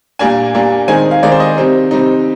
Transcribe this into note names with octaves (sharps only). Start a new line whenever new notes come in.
A#2 G3 A#3 D4 G#5
A#2 G3 A#3 D4
D#3 G#3 C4 D#4 G#5
F5
D#3 G#3 C4 D#4 D5
C5
D#5
C3 G3 C4 D#4
C3 G3 C4 D#4